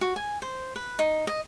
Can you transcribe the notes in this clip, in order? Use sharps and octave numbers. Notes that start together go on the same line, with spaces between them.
F#4
G#5
C5
B4
D#4
D#5